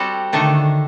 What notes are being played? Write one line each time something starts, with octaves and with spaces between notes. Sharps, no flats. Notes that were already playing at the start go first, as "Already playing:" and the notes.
Already playing: G3 C4 F#4 A4
D3 D#3 A3 D4 A4